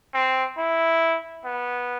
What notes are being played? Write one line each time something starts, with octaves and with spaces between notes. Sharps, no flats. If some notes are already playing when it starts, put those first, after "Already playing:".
C4
E4
B3